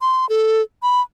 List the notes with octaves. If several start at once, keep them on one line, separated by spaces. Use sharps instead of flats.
C6
A4
B5